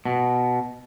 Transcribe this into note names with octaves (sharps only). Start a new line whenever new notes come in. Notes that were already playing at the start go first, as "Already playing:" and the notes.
B2